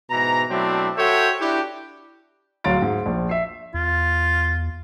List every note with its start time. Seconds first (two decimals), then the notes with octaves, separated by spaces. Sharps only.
0.10 G#2 B2 E3 A#5
0.50 B2 F#3 A3 C4 D4 E4
0.97 F#4 A4 C5 C#5 E5 G5
1.40 D4 E4 F#4 G4
2.64 D1 F#3 F5 C6 A6 D7
2.82 G#2
3.06 A#1
3.29 E5 C7
3.74 E2 F4